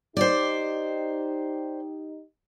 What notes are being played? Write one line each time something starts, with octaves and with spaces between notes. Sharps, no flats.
D#4 G4 C5 D5